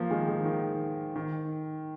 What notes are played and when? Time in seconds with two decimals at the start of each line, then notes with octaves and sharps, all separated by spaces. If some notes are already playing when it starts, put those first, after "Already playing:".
Already playing: F3 A#3
0.11 D#3 G#3
0.28 D#3 G#3
0.45 D#3
1.16 D#3